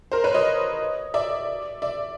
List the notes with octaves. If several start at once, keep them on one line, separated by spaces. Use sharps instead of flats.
A#4 C5
B4 C#5
C#5 D#5
D5 E5
D5 E5